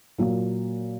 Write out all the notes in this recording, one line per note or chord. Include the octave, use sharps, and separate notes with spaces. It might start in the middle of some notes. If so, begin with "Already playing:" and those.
A#2 F#3 A#3